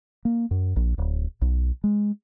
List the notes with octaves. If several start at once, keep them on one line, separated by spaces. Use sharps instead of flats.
A#3
F#2
A#1
D1
B1
G#3